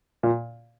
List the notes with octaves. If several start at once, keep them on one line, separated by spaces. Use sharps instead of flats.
A#2